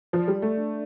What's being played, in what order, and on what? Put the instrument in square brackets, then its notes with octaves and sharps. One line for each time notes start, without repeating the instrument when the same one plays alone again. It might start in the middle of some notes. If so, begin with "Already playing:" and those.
[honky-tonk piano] F3 [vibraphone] D5
[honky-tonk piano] G3
[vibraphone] D5
[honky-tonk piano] A3
[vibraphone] D4